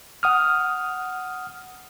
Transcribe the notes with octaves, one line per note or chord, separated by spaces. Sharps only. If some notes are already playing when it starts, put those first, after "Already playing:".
F#5 D#6 F6